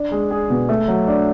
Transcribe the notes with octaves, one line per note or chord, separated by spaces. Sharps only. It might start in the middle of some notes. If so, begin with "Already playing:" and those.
Already playing: D4
G#3
G#4
B2
A3
F#3
D4